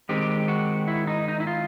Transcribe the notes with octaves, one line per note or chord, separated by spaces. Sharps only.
D#3 G#3 C4 G4
F#4
E4
D#4
D#4
E4
F4